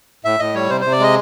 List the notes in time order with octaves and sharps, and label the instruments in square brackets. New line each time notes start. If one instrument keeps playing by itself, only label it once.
[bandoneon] A2 E5
A2 D#5
G3 C#5
C3 C5
C3 C5
D5
G#3 D#5